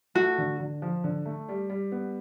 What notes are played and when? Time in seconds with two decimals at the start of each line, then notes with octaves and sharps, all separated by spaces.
0.15 A3 F#4
0.38 D3
0.60 D3
0.82 F3
1.04 D3
1.25 A3
1.49 G3
1.70 G3
1.92 B3